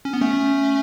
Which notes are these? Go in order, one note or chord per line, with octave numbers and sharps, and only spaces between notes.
C#4
B3
A3 C#4